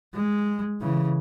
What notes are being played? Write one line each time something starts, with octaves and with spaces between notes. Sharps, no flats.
G#3
C#3 E3